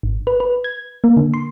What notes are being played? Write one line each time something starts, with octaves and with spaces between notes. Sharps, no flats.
G#1
B4
B4
G#6
A#3
D3
C6